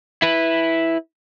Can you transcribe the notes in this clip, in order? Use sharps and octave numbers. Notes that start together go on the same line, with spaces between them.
E4 B4